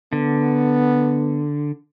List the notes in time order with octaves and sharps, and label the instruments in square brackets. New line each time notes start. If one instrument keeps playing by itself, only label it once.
[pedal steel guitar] D3 [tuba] B3